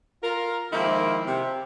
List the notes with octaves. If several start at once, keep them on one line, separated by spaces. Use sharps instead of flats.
F4 A#4
D#3 F3 G#3 A#3 C4 E4
C3